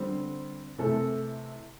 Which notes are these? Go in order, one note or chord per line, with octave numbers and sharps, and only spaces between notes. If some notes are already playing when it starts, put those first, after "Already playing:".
Already playing: D3 G3 C4
C3 E3 A3 A4